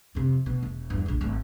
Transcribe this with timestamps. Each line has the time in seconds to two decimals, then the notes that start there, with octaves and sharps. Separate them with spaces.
0.15 F2 C3
0.46 B2
0.63 E1
0.90 E2 G2
1.06 A#1 F#2
1.21 G#1 G#3